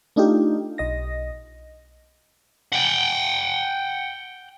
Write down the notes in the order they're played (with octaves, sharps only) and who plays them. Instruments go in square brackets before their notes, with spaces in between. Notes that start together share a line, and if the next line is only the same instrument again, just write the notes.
[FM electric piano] A3 D4 D#4 F4 G4
B1 D#5 A#6
[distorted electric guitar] F#5 G5